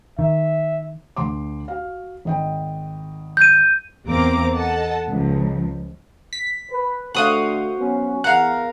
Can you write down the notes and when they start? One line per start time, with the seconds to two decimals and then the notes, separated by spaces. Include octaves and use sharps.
0.19 D#3 E5
1.16 D2 C6 D6
1.68 F#4 F5
2.25 G#1 D#5 G5
3.37 G6 D#7
4.07 E2 A#3 C4 A#5 D6
4.53 A4 D#5 F#5 A5
5.09 C#2 F3
6.33 B6
6.71 B4
7.15 D3 A3 F#4 C5 F5 D#6 F#6
7.79 F#3 B3 C#4
8.24 E2 A#4 F5 F#5